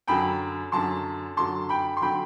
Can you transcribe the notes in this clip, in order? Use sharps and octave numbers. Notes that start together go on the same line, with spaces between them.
F#2 D3 F#3 G5 B5
F#2 D3 F#3 A5 C6
F#2 D3 F#3 A5 C6
G5 B5
C6
D3 F#3 G5 B5